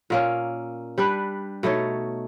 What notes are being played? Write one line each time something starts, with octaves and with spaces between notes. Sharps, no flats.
A#2 A#3 C#4
G3 D4 B4
B2 A3 D#4 C#5